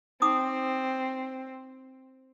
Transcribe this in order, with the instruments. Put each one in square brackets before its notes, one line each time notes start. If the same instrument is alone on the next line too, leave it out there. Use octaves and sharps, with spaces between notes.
[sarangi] C4 [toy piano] D#4 D6 D#6